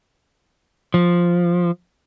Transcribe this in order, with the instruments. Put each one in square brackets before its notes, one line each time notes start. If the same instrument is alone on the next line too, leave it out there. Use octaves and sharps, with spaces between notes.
[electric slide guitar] F3